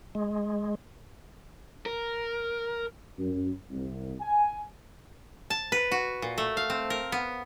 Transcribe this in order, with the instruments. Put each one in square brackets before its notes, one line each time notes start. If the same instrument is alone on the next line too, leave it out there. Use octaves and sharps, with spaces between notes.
[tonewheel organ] G#3
[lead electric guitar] A#4
[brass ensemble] F#2
C2
G#5
[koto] A5
B4
F#4
A#2
A3
F5
C4
A#4
B3